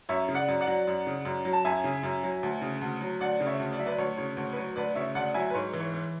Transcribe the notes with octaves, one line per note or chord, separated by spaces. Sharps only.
F#2 C#5 E5
C#3
D5 F#5
F#2
D5 F#5
F#3
F#2
C#3
F#2
F#3
A5
F#2 E5 G#5
C#3
F#2
F#3
D2
C#3
D2
F#3
D2 D5 F#5
C#3
C#5 E5
D2
D5
F#3 E5
B4 D5
D2 C#5
C#3 C#5
D2 C#5
B4
F#3 C#5
D2 B4 D5
C#3 C#5 E5
D2 D5 F#5
F#3 E5 G#5
B4
G#2 C#5
E3
C#5
E3